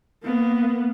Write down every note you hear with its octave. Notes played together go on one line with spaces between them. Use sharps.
A#3 B3